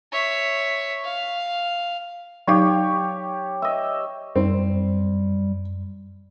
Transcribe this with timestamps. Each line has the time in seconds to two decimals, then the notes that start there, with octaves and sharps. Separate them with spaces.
0.12 C#5 E5
1.04 F5
2.48 F#3 D#4 G4 C#5 F5
3.62 D#5 E5
4.36 F#2 G3 C4